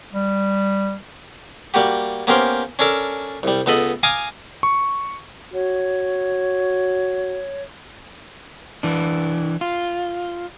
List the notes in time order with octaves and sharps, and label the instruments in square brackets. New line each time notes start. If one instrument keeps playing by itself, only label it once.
[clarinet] G3
[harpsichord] G3 A#3 F#4 G4
A#3 B3 C#4 G4 A#4 C5
C#4 D4 A4 A#4 A5
C2 G3
C#2 B3 A4 D#5 B5
F5 G#5 A#5 D6 D#6
[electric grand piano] C#6
[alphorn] F#4 [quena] C#5
[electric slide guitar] E3 D4
F4